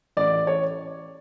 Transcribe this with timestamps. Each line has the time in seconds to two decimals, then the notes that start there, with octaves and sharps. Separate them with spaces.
0.17 A1 D5
0.47 C#5